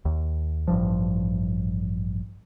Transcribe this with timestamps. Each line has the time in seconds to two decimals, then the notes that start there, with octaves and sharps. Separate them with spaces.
0.05 D#2
0.68 A1 G2 F3